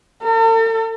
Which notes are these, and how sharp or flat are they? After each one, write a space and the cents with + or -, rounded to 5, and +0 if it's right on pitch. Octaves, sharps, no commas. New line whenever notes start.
A4 +45